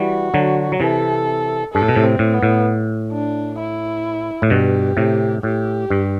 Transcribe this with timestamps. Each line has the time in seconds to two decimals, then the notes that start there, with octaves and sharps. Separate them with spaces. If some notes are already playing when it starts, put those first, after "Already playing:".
Already playing: E3 G3 F#4
0.34 D3 F#3
0.72 F#3
0.80 C3 E3 A4
1.73 G2 A4
1.82 A2
1.88 B2
1.96 A2 C3
2.04 C4
2.19 A2
2.34 B3
2.43 A2
3.12 D4
3.59 E4
4.42 A2
4.50 G2 B2 G4
4.97 A2 C3
5.43 A2 G4
5.90 G2